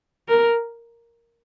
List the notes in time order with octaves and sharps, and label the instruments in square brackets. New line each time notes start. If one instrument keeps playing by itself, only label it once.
[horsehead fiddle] A#4